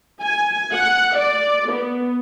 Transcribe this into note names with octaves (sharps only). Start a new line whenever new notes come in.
G#5
F#5
D5
B3